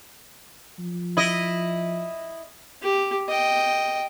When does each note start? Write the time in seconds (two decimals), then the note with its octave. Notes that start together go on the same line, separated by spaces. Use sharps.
0.79 F3
1.17 E4 D#5
2.82 G4
3.29 D#5 G5